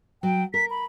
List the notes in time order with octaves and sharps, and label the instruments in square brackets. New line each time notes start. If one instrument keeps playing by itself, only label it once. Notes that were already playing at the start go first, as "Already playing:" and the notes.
[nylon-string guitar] F#3 [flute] G5
[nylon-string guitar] A#4 [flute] B6
[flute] B5